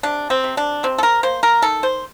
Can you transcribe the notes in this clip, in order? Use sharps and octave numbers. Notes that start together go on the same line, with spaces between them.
C3 D4
C4
C3
D4
C3 C4
A4
A#4
A#3 C5
A#4
D#3 A4
C5